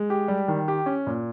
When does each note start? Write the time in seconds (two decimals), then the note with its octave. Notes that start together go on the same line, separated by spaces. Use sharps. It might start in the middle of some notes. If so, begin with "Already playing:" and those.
Already playing: G#3
0.10 G4
0.28 G3
0.48 D#3
0.68 G4
0.86 C#4
1.07 A#2